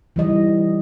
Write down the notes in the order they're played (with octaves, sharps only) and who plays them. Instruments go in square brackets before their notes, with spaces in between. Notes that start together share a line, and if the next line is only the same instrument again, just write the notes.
[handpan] E3 G3 D#5